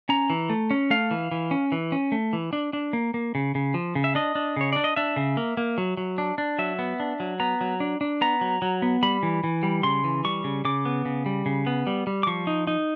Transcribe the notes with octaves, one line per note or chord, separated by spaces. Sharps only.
C#4 A#5
E3
A3
C#4
A3 F5
E3
E3
C#4
E3
C#4
A3
E3
D4
D4
A#3
A#3
C#3
C#3
F3
C#3
E5
D4 D#5
D4
C#3 C#5
D4 D5
D#5
D4 E5
C#3
A#3
A#3
F#3
F#3
D4
D4
F#3 E5
B3
D4
F#3
B3 A#5
F#3
D4
D4
B3 A#5
F#3
F#3
B3
G3 B5
E3
E3
G3
C#3 C6
E3
G3 C#6
C#3
C#3 D6
B3
C#3
G3
C#3
B3
G3
G3
D6
F3 C#6
D#4
D#4